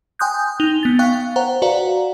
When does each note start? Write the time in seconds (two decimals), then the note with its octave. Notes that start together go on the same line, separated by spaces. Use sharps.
0.19 G5 G#5 C6 D#6 F#6 G6
0.60 D#4 F7 G7
0.83 B3 A6
0.99 F5 G5 C#6 F#6
1.36 C5 F#5 A#5
1.62 F#4 B4 D5 F5 F#5 A#5